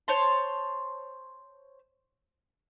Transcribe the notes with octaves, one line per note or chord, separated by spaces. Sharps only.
C5 C#5 A5 C6